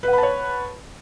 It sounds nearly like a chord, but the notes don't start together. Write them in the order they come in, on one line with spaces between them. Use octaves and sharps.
B4 F#5 B5 A5 C#5